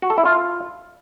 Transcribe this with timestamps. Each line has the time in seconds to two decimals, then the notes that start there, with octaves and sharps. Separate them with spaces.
0.02 F#4
0.10 A4
0.18 E4
0.25 F4